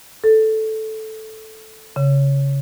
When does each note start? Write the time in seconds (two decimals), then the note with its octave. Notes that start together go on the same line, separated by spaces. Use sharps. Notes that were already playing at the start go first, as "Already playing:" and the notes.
0.24 A4
1.96 C#3